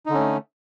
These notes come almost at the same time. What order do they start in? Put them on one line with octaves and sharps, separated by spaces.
D#4 D3 C#4 A3